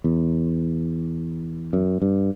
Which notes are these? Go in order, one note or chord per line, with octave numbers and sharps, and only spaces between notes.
E2
F#2
G2